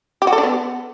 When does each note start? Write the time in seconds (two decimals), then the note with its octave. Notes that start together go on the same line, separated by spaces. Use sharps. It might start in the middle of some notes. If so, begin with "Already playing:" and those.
0.22 G4
0.27 F#4
0.33 A4
0.38 D4
0.43 B3